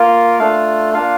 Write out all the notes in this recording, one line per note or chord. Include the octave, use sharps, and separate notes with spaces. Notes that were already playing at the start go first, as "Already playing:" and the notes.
Already playing: A#3 F4
A3 D4 F4 F5
A#3 D4 F4 F5